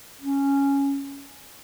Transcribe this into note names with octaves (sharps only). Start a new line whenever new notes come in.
C#4